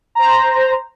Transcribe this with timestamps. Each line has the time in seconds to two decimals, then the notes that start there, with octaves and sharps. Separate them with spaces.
0.15 C5 A#5